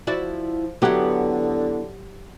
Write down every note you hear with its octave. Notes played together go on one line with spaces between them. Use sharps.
F3 E4 F#4 D5
D3 F#3 B3 E4 G4 F#5